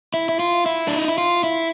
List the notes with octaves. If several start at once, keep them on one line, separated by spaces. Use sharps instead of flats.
E4
E4
F4
E4
D4
D#4
E4
F4
E4